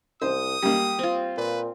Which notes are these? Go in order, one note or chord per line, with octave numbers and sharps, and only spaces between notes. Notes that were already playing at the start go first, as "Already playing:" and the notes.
C2 C5 D#6
G3 A#3 G4
C4 F4
A#2 B4